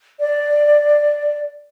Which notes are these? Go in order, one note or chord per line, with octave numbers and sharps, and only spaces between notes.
D5